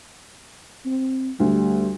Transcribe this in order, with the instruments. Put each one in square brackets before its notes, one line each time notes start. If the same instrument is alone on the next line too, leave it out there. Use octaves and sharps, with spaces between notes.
[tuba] C4
[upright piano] D2 [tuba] G3